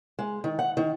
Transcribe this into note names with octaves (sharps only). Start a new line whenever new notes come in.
G#3
D#3
F#5
D#3